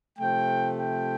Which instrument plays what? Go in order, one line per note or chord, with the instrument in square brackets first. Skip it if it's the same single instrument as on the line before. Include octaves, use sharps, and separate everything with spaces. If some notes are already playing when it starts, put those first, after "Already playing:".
[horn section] C3 F3 A3 G5
G5